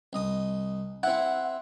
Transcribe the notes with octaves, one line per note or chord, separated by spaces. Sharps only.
C2 D#5 D#6
C4 E4 E5 F#5